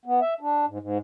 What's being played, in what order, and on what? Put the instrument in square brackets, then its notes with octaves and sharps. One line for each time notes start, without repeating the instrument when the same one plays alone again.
[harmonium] B3
E5
D4
G#2
G#2